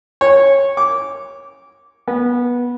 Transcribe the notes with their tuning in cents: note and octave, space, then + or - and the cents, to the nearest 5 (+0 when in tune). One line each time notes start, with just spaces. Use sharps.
C#5 -10
D6 -15
B3 -20